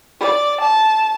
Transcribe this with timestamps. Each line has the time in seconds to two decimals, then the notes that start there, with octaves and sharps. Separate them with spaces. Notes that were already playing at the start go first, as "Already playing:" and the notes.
0.20 D5
0.61 A5